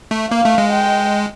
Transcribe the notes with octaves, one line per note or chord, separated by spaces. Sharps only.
A3
A#3 F5
A3
G#3
G5